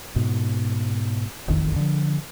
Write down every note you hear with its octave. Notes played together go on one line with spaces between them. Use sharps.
G#2 B2
E1 A1 F2 D#3
D3 F3